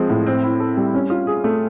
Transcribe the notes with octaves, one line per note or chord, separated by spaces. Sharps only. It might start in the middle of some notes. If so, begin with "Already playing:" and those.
Already playing: F3 G#3 C4
A2
C4
E4
A4
G3
C#4
F4
G#4
A3